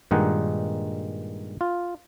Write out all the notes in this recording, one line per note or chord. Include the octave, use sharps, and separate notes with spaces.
G2 A#2 D#3 G#3 D#4 F#5
F4